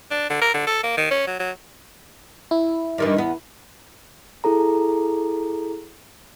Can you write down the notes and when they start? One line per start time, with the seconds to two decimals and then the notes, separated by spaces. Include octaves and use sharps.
0.11 D4
0.30 D3
0.41 A#4
0.54 D3
0.67 A4
0.83 A#3
0.97 D#3
1.11 C#4
1.27 F#3
1.39 F#3
2.51 E4
2.98 G2 D#3 E3
3.16 E2 B3
4.44 E4 G#4 A4 A#5